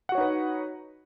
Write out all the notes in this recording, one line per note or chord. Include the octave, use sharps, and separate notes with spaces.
D#4 F#4 B4 C#5 F#5